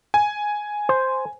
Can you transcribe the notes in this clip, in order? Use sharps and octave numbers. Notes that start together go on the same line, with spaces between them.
G#5
C5